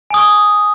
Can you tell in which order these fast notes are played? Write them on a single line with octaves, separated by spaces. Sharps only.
G#5 D#6 C#6